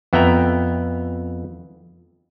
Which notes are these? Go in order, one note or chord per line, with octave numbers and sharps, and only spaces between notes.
F2 B3 E5 G5 A#5